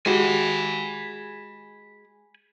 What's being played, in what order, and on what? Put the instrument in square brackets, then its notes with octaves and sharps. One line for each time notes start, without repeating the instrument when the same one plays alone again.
[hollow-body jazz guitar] G#3 F#4 G4 [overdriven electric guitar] G#5 B5